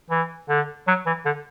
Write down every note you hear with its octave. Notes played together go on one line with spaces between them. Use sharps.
E3
D3
F#3
E3
D3